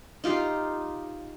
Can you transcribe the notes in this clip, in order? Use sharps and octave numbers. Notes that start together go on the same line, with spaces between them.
D#4 F4 G4 F5